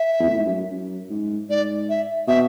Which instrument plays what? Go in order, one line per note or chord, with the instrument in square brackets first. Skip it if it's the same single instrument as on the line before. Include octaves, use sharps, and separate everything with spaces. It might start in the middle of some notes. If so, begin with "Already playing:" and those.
Already playing: [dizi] E5
[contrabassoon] E2
A2
G#2
F#2
F#2
G#2
[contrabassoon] G#2 [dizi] D5
[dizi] E5
[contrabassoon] B2 [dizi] E5